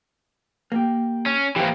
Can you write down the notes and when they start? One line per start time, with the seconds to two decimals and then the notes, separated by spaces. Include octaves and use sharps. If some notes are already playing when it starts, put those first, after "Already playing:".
0.72 A#3 G4
1.26 C#4
1.56 E3 A#3 G4 C5